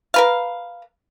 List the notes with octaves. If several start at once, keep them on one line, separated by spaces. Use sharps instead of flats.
A#4 B4 F5